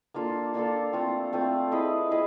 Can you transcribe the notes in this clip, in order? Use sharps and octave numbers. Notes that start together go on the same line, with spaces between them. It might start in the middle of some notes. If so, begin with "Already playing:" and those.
A#3 D4 F4 A4
A#3 D4 F4 A4
A3 C4 F4
A3 C4 F4
E4 G#4 B4 D#5
E4 G#4 B4 D#5